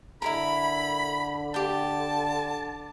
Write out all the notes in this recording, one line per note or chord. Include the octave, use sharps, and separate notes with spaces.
D3 E4 G#4 A#4 B5
G4 G5 A5